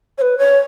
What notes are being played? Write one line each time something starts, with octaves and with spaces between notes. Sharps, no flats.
C#5
B4
C#5